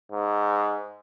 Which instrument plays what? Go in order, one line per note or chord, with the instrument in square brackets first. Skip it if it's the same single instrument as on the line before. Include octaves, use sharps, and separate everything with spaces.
[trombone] G#2